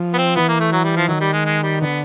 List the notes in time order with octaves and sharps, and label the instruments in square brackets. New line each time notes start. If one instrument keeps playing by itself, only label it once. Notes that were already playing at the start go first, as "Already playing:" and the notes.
Already playing: [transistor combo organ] F3
[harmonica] B3
C4
[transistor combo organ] E3 [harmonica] B3
[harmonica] A#3
A3
F#3
G3
F3
[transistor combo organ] D#3 [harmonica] F#3
[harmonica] G3
G#3
G#3
G3
[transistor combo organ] D3 [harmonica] B3